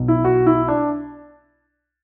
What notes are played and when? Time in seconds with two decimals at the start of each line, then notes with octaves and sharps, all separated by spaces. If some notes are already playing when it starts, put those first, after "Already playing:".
Already playing: B1 B2
0.08 E4
0.24 F#4
0.46 E4
0.68 D4